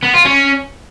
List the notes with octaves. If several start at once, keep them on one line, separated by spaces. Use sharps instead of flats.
B3
F4
C#4